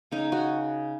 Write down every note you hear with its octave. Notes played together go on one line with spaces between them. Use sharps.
C#3 D#4
C#3 F#4